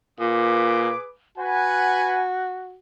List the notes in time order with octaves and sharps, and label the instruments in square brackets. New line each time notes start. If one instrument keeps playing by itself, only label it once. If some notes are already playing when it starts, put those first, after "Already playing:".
[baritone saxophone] A#2 [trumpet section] G#4 B4 D6
[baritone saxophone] F#4 [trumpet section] B4 F#5 G#5